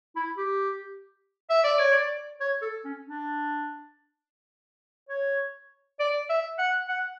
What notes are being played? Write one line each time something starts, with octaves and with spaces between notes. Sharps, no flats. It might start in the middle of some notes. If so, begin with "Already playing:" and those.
E4
G4
E5
D5
C#5
D5
C#5
A4
C#4
D4
C#5
D5
E5
F#5
F#5